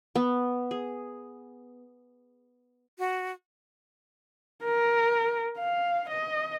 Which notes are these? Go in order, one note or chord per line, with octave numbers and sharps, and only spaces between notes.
B3
G#4
F#4
A#4
F5
D#5